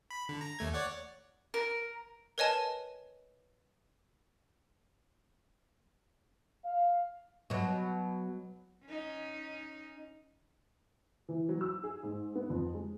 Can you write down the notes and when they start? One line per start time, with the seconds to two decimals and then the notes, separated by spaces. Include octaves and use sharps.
0.11 B5
0.29 D3
0.41 A#5
0.59 D#2 A3 G#6
0.73 C#5 D5 F#5
1.54 A#4
2.38 A#4 B4 C#5 D#5 G#5 A5
6.65 F5
7.50 B2 F#3
8.86 C#4 D#4
11.29 E3
11.49 F#3
11.61 E6
11.83 G#4
12.03 G#2
12.36 B3
12.50 F2
12.74 G#3